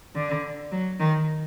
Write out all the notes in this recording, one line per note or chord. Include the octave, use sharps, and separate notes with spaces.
D3
F#3
D#3